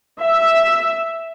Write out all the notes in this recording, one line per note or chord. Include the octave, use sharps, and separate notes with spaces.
E5